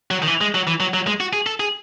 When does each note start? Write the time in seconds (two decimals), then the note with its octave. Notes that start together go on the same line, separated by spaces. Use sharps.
0.11 F#3
0.23 D#3
0.27 E3
0.41 G#3
0.54 F#3
0.67 E3
0.80 F#3
0.94 F#3
1.07 G#3
1.20 F#4
1.33 G#4
1.46 A4
1.60 G#4